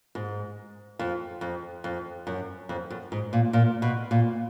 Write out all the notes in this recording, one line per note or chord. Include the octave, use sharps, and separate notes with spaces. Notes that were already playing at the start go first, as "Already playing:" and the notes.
G#2
F2
F2
F2
F#2
F2
F#2
G#2
A#2
A#2
B2
A#2